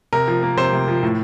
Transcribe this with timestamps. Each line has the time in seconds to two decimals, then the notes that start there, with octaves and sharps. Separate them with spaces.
0.13 C3 A#4
0.28 F3
0.43 A#3
0.57 C3 C5
0.73 C3
0.88 F3
1.03 A2